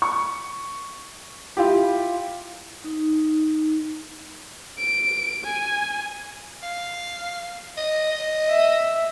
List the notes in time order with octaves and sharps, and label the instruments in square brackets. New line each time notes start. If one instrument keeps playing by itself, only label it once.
[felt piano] C#6
E4 F4 G4
[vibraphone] D#4
[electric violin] D7
G#5
[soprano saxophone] F5
D#5
D#5
[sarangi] E5